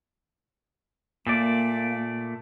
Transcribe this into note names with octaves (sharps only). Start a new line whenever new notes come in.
A#2 A3 A#3 D5